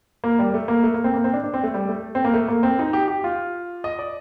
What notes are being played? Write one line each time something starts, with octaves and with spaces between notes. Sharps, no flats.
A#3
G3
A3
A#3
A3
A#3
C4
A#3
C4
D4
D4
C4
A3
G3
A3
C4
A#3
A3
A#3
C4
D#4
G4
G4
F4
D#5
D5